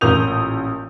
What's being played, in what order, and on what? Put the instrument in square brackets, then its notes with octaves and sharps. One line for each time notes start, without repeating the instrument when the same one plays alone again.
[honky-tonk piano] A1 A#2 A#4 D#6 G6 F7